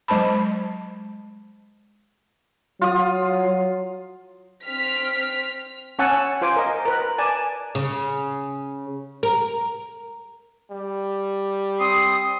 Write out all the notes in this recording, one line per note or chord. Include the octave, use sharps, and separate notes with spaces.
F#3 G#3 C5 A5 B5
F#3 F4 D#6
C4 F6 B6
C#4 C#5 F#5 G#5 A5 E6
F4 C5 G#5 D6
A#4 D#5
A#4 B4
D5 G#5 A5
C#3
A#4
G3
C4 C6 D#6